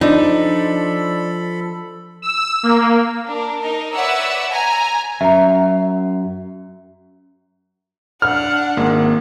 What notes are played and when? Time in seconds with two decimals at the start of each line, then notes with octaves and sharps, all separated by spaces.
0.01 F3 D4 D#4 A4 B5
2.22 E6
2.63 A#3
3.27 D4 A#4
3.60 D#4 A#4 D#5
3.94 B4 C#5 D5 E5 F#5 E6
4.51 G#5 A#5
5.21 F#2 E5 A#5
8.22 D4 F#5 F6
8.77 G#1 G#3 A#3